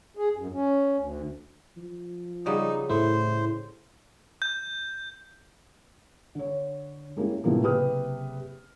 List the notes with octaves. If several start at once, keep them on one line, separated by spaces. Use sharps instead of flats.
G#4
F#2
C#4
D2
F3
C#3 G3 D#4 F#4
A2 A3 E4 C5
G6
D3 C#5
G#3 A#3 C#4 E4 G4
A2 C3 F3 G#3 A#3 B3
F#1 C3 G4 B4 D#6 F6